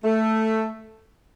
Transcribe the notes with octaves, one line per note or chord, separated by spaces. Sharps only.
A3